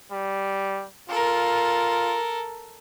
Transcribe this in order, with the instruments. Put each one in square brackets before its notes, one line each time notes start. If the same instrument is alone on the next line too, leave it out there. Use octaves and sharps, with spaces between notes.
[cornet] G3
[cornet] F4 [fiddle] A4 A#4